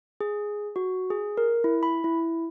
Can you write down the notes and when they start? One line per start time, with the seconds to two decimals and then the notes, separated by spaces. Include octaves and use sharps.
0.20 G#4
0.76 F#4
1.10 G#4
1.38 A#4
1.64 E4
1.83 B5
2.04 E4